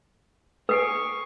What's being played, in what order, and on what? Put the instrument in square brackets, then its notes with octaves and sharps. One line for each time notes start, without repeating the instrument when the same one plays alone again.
[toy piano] B4 [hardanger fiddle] G#5 C#6 [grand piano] D#6 C7 D7